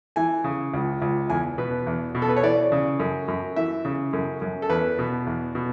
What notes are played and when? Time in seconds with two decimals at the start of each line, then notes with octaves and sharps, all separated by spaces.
0.16 E3 G#5
0.44 C#3
0.74 C#2
1.02 C#2
1.30 E2 G#5
1.58 B2 B4
1.87 E2
2.15 B2
2.22 A4
2.29 B4
2.37 C#5
2.43 E3 D5
2.72 C#3
3.00 F#2
3.28 F#2
3.56 E3 E5
3.85 C#3
4.13 F#2
4.42 F#2
4.62 A4
4.70 E2 B4
4.99 B2
5.27 E2
5.55 B2